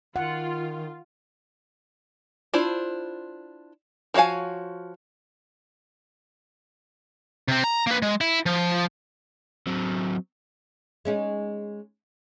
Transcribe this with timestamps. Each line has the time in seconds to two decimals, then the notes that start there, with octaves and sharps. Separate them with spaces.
0.16 D#3 F4 F#5
2.54 D4 E4 F4 C5
4.14 F3 F#4 C#5 F5 G#5
7.48 C3 C4
7.64 A#5
7.87 A#3 B4
8.02 G#3
8.21 E4
8.46 F3
9.67 F#3 C4
11.05 G#3 C#4 D#4